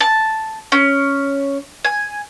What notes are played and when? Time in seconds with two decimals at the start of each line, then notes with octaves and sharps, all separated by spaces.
0.01 A5
0.72 C#4
1.85 G#5